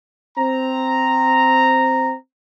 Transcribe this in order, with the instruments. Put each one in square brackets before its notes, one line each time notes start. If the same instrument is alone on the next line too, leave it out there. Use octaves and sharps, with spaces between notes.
[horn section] C4 A#5